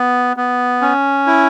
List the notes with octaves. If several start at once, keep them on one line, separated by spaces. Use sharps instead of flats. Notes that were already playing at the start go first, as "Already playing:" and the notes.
Already playing: B3
B3
C#4
E4